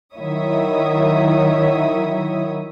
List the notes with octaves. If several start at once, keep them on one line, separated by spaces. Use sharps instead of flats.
D#3 F#3 E4 C#5 E5 D#6